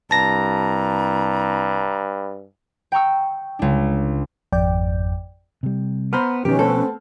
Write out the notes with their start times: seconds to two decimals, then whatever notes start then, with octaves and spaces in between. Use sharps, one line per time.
0.11 C2 G2 A5 A#5 A#6
2.92 G5 A#5 C#6 E6
3.59 C#2 D4
4.52 G#1 F2 D5 G5
5.63 C3 G3
6.13 B3 C5 A#5 B5 F6
6.45 B2 D#3 F3 C#4 G4 A#4 B4
6.59 A3 B3 C4 A4